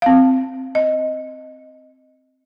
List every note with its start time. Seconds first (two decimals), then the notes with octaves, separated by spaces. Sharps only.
0.02 C4 F5
0.75 D#5